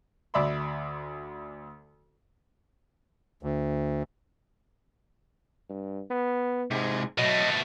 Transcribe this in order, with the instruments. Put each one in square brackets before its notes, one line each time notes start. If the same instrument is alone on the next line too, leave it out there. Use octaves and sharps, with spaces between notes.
[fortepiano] D2 D5 E5 B5 C6
[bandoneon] D2
[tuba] G2
B3
[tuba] G#2 [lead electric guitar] C3 G#3
[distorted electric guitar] B2 A3 [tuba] F#3 [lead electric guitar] D#5